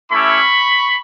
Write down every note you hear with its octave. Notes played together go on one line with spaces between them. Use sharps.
A3 C#4 E4 G4 B5 C#6